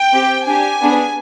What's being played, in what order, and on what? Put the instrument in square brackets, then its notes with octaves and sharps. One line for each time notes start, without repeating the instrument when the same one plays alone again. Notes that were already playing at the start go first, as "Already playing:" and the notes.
Already playing: [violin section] G5
C4 G4
D4 G4 G#5
B3 D4 G#4